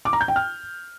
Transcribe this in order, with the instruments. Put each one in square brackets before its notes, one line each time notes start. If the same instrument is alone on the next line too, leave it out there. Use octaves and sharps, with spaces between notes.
[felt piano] D6
A#5
G6
G5
F6